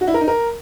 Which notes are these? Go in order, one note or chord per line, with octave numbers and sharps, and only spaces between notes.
F#4
E4
A#4
D#4
A#4